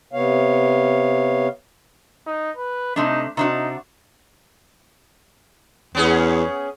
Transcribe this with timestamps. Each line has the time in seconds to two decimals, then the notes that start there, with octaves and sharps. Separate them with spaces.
0.13 C3 B3 C#5 F5
2.26 D#4
2.57 B4
2.96 C3 A3 D4 D#4
3.37 C3 D4 D#4 F#4
5.95 E2 B3 C#4 G#4